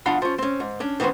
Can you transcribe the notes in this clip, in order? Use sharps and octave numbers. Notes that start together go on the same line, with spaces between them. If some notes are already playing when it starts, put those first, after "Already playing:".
E2 D4 F4 F5 F#5 B5
F3 C#4
C4 C#4
G#2
C#4 D4
D#3 E3 B3 C#4 C5